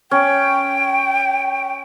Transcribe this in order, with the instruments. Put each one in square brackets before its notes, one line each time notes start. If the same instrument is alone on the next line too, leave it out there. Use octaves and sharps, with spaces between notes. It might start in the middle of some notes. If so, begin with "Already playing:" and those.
[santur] C#4 [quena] G5